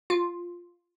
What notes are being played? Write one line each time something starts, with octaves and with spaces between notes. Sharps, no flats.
F4